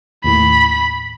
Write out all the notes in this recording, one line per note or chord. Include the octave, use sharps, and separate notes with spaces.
D#2 A2 B5